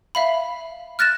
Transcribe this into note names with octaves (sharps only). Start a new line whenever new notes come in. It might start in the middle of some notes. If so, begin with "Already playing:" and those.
E5 F5 B5
F6 F#6 A6 A#6 E7